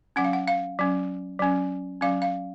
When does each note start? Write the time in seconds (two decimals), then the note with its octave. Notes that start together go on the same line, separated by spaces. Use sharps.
0.16 F#3 C#4 F#5
0.24 F5
0.33 F#5
0.48 F5
0.79 F#3 C#4
1.39 F#3 C#4
2.01 F#3 C#4 F5
2.22 F5